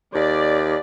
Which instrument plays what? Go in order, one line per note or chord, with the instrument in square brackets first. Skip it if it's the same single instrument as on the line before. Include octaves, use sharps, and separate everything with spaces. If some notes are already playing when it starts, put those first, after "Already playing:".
[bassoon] D#2 [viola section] D5